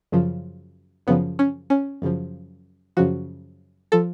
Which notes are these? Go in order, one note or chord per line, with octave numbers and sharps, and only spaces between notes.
F#2 C#3 F3
F#2 C#3 F3 B3
C#4
C#4
F#2 C#3 F3
F#2 C#3 F3 F#4
F3 A4